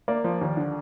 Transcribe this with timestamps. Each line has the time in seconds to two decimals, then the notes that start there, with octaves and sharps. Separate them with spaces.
0.08 A#3 D5
0.24 F3
0.41 D#2
0.57 D3